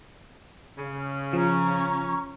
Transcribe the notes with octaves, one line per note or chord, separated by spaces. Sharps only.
C#3
F3 C#4 A#5 C#6